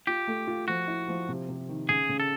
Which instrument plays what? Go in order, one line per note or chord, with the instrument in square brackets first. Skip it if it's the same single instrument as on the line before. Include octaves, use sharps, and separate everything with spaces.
[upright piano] F4 [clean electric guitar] G4
[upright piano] A3
F4
[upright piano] F3 [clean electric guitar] F#4
[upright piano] E4
F3
C3
C3
D#3
[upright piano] C#3 [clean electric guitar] G#4
[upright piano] C#3
[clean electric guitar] A4